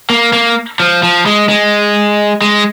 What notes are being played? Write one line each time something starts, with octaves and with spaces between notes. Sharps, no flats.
A#3
A#3
F3
F3
G#3
G#3
G#3